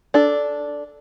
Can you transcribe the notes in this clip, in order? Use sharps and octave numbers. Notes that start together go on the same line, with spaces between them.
D4 A4